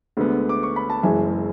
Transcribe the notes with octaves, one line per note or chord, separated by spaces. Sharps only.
D2 D3 G#3 B3
D6
C#6
B5
A5
F#1 F#2 E3 G#3 E5 G#5